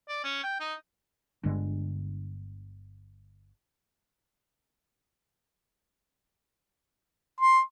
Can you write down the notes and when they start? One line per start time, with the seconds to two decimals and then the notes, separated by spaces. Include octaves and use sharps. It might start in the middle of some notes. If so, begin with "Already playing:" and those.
0.09 D5
0.24 C#4
0.43 G5
0.60 D#4
1.44 G1 G2 D3 G#3
7.40 C6